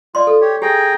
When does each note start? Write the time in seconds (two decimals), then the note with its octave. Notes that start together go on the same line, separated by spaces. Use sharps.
0.15 F4 D5 C6
0.27 A4
0.41 G4 C#5
0.62 G4 G#4 G5 A#5